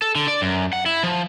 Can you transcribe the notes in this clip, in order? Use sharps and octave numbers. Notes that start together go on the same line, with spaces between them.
A4
D3
D5
F#2
F#5
E4
F3